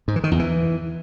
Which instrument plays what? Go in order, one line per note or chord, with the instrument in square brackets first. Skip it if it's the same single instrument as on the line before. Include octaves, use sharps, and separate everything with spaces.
[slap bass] G#2
E3
D#3
E2
E3